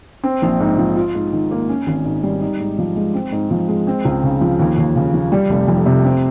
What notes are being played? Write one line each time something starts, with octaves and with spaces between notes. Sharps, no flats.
C4
A#1
G#2
F3
F4
G#2
D#3
A#3
C#4
G#1
G#2
G3
D#4
G#2
F3
G#3
C4
G#2
F3
G#3
C4
C#2
C#3
F3
D#2
D#2
C#3
F3
G3
F1
F2
C3
C4